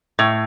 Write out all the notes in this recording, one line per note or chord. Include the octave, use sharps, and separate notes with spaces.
A2